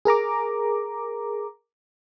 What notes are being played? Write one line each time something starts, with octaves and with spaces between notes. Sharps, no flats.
G#4 A#4 A#5 D6